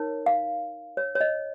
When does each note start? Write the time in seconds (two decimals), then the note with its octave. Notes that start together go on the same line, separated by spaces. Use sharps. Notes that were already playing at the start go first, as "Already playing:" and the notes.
Already playing: D#4 A#4 C#5
0.26 F5
0.97 C#5
1.15 C#5
1.21 D#5